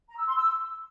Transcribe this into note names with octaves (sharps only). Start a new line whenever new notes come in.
A#5
E6
C6
E6